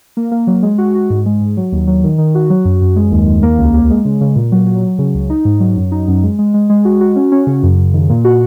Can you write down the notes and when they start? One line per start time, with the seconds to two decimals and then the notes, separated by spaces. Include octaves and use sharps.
0.17 A#3
0.32 A#3
0.47 F#3
0.63 G#3
0.78 F#4
0.95 F#4
1.10 G#2
1.26 G#3
1.41 G#2
1.57 F#3
1.72 D#2
1.87 F#3
2.04 D#3
2.18 D#3
2.35 F#4
2.50 F#3
2.65 F#2
2.81 F#2
2.96 G#3
3.11 D#2
3.27 D#2
3.43 A#3
3.58 C#2
3.74 A#3
3.90 G#3
4.05 C#3
4.21 C#3
4.36 A#2
4.52 F#3
4.67 F#3
4.83 F#3
4.98 C#3
5.14 C#2
5.30 D#4
5.45 G#2
5.60 F#3
5.77 F#2
5.92 D#4
6.08 F#2
6.23 G#3
6.39 G#3
6.54 G#3
6.70 G#3
6.85 F#4
7.01 F#4
7.16 C#4
7.32 C#4
7.47 C#3
7.63 F#2
7.78 F#2
7.94 D#3
8.10 A#2
8.24 F#4